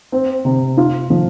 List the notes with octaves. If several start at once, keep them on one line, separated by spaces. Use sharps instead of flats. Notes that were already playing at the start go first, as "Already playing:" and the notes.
C4
C3
F4
F3